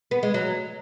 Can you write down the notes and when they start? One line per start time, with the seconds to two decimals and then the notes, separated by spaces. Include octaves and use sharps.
0.11 B3
0.23 G#3
0.34 F#3